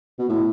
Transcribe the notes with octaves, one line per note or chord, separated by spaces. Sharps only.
B2
A2